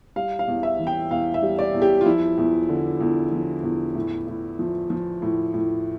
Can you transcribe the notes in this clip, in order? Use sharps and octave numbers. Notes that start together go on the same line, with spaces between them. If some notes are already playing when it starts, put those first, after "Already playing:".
G3 F5
F5
E2
E5
E3
G5
E2 F5
E5
G3
D5
E2
G4
F4
F3 E4
E2
D3
E2
F3
E2
A2
A2
F3
F3
A2
A2